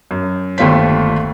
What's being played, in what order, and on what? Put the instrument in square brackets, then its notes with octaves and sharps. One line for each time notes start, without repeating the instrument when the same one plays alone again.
[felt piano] F#2
G1 D#2 A3 F4 C5 B6